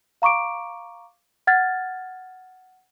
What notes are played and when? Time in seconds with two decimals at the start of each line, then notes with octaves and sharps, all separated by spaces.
0.22 F5 A#5 C#6 D6 D7
1.47 F#5 F6 G#6 A6